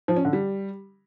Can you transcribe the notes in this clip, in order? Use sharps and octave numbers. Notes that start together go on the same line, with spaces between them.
F3
C#4
D3
G3